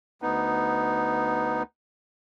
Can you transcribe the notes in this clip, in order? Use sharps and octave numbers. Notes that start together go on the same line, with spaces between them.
D2 B3 D#4